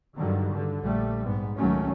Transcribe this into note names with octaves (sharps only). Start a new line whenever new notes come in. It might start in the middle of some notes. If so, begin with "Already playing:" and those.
G2 D3 D#3 F#3 G3
G2 D3
A#1 G3 A3
G#2 B3
C#2 D#3 F#3 A3 C#4